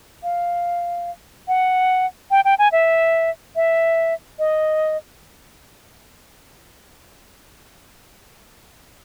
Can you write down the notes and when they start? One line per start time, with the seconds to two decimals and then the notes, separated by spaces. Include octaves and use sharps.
0.23 F5
1.48 F#5
2.31 G5
2.45 G5
2.59 G#5
2.72 E5
3.56 E5
4.39 D#5